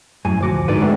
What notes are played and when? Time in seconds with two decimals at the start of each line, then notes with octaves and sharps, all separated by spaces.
0.25 F#2 A2 G#5
0.41 D2 F3 F#4 D6
0.68 G#2 D3 B4 D5
0.82 A3 C4 D4 F#4